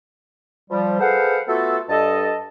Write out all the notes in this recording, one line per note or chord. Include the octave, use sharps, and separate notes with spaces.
F3 G3
G#4 A4 B4 C5 F5 F#5
A3 B3 F4 F#4 A4
G2 A4 D#5 A5